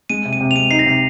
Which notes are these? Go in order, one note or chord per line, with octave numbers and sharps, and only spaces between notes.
G#3 D#7
C3
D#7
C3
F7
G#3 D#7
D#4 C7
A#6
C3